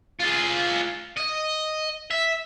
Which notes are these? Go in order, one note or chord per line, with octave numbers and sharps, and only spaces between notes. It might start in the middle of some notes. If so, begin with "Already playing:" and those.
F4 G#4
D#5
E5